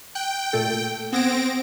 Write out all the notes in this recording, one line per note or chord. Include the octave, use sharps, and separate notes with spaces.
G5 F#6
A#2 A3 A4
B3 C4 G#6 A#6 C#7 D7 E7